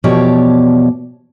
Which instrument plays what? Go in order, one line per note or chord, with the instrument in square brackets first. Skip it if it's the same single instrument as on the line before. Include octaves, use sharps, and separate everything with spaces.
[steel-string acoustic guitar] E2 B2 F3 G4 C#5 D5